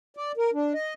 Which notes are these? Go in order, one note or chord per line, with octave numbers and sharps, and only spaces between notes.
D5
A#4
D4
D#5